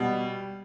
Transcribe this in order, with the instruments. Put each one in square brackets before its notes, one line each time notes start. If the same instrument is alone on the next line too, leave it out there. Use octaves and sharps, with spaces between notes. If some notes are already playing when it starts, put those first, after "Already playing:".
Already playing: [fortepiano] B2 [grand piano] G3